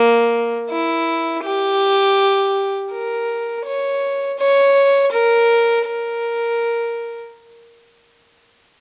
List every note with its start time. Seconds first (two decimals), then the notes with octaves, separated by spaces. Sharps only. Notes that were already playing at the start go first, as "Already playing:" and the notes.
Already playing: A#3
0.70 E4
1.44 G4
2.92 A#4
3.65 C#5
4.38 C#5
5.12 A#4
5.86 A#4